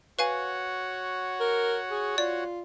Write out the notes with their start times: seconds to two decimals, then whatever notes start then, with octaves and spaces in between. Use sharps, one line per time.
0.19 F#4 B4 C#5 F5 F#5 G#5
1.40 A#4
1.91 G#4
2.18 F4 D5